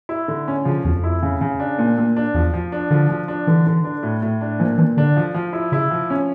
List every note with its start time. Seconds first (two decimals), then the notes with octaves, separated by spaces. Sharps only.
0.09 E4
0.28 D3
0.48 C#4
0.65 C#3 F3
0.84 E2 F3
0.94 F2
1.04 E4
1.22 C#3
1.41 C#3
1.60 D4
1.79 A#2
1.98 A#2
2.16 D4
2.34 E2 F3
2.53 F3
2.72 D4
2.90 D3 F3
3.09 F3
3.28 D4
3.47 D3 E3
3.67 D3
3.85 D4
4.03 A2
4.22 A2
4.41 D4
4.59 A#2 F3
4.78 A#2 E3
4.97 D3 D4
5.16 F3
5.34 F3
5.53 E4
5.72 C#3 E4
5.91 F3
6.10 C#4